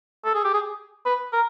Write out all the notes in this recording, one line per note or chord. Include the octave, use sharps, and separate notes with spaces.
A4
G#4
G4
G#4
B4
A#4